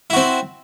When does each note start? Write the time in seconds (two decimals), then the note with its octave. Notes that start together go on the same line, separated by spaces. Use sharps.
0.10 E4
0.13 F#4
0.16 C4